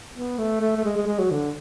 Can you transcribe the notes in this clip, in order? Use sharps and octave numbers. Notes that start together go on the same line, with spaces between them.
B3
A3
A3
A3
G#3
G#3
G#3
F#3
D3